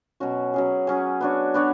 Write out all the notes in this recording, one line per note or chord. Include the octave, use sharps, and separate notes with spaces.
B2 F#3 C#4 F#4
F#3 C#4 G#4
F#3 C#4 G#4
B3 D4 F#4 C#5
B3 D4 F#4 C#5